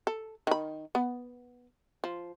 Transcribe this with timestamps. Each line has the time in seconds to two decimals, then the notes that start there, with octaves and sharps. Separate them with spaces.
0.07 A4
0.47 D#3 B5
0.95 B3
2.04 F3